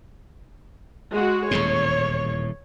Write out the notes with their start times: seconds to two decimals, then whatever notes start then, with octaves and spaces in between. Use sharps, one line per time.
1.13 G#3 F#4
1.51 D#1 E2 A2 C#5